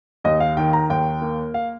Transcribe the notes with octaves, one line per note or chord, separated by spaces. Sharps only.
D#2 D#5
F5
D#3 G5
A#5
D#2 G5
A#3
F5